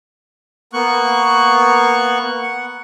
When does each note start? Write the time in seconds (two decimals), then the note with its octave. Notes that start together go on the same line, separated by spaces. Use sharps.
0.73 A#3 B3 C#6 F#6
2.42 F#5